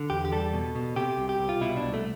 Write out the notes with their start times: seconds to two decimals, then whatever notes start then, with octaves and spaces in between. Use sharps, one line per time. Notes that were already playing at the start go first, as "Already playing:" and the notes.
Already playing: D3
0.10 E2 G4
0.25 G4
0.32 G3 A4
0.53 B2
0.75 B2
0.96 C3 G4
1.17 C2
1.29 G4
1.39 C2
1.49 F4
1.61 B2 E4
1.77 D4
1.83 C2
1.94 A3